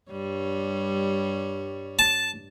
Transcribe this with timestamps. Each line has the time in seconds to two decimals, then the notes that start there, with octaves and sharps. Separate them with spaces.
0.11 G2 G3 C#5
1.99 A5